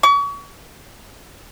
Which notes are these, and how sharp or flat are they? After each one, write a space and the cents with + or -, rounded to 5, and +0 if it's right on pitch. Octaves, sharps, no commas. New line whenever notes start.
C#6 +35